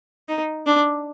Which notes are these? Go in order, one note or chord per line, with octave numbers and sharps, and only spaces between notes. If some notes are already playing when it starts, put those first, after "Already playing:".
D#4
D4